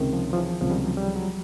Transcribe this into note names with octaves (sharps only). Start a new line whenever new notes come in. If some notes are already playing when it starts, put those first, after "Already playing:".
Already playing: C#2 C3 D#3
F3
F3
E3
C#2 C3 D#3 F3
G3
F#3
G3
F#3